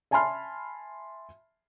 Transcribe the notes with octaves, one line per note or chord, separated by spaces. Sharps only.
E5 G#5 A5 B5 C6 F6